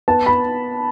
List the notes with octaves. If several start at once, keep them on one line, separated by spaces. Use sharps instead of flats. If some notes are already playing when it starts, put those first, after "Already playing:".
B3 A5
B5